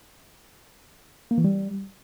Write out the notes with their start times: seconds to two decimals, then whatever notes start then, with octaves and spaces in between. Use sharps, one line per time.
1.31 A#3
1.38 E3
1.44 G3